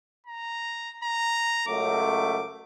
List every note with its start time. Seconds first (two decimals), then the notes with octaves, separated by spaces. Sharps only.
0.27 A#5
1.04 A#5
1.68 C#2 F#2 A3 D6